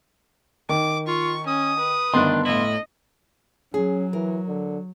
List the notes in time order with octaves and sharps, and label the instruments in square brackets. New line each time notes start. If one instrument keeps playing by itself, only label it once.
[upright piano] D#3 [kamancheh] D6
[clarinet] F4 [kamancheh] C#6
[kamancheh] C#4 [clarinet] D#6
[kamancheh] B4
[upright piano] G1 B3 C6 [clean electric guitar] D#3 A3 D4
[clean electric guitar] A2 E4 [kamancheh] D#5
[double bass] F#3 [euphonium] C#4 [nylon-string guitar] G#4
[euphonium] E3 [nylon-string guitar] A#4
[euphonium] D3